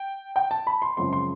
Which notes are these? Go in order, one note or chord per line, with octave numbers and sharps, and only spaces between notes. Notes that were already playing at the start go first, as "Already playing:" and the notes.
Already playing: G5
G5
A5
B5
C6
F#2 C#3 F3 G#3 C4 C6
C6